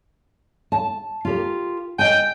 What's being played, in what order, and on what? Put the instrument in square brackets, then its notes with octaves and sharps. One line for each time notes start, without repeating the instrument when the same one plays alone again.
[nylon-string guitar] A5
F4 G4 A#4
[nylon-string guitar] D#5 G#5 [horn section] G5